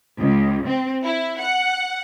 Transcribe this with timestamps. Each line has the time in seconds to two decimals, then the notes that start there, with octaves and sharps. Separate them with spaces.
0.19 C#2
0.68 C4
1.04 E4
1.40 F#5